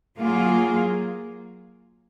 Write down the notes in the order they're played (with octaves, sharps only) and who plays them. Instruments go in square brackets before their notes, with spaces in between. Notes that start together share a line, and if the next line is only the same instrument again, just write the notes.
[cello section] F#3 A#3 F4 G#4